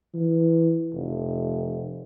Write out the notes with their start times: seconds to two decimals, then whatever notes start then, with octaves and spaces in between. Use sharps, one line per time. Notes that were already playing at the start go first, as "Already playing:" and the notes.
0.14 E3
0.94 F1